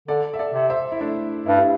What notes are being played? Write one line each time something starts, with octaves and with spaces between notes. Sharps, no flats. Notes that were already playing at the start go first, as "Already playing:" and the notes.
D3 A4 D5
E5
A4 D5
C3
C5 E5
E4
A3 D4
G2 E4
G4